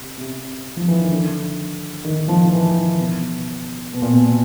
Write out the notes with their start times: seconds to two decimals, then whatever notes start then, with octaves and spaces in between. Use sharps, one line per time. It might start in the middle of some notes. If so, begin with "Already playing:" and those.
Already playing: C3
0.18 C3
0.77 F3
0.88 E3
1.00 D#3
1.11 D3
2.05 D#3
2.28 F3
2.45 F3
2.52 E3
2.75 D#3
2.99 B2
3.94 B2
4.02 A#2
4.12 B2